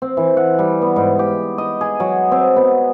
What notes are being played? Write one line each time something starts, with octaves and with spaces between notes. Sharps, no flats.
C4
E3
F#5
G3
B3
G#2
G4
D#5
G#4
F#3
C4
B3